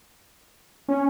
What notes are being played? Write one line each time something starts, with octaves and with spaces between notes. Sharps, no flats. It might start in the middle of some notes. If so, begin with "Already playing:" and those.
C#4